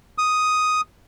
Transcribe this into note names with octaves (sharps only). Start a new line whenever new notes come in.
D#6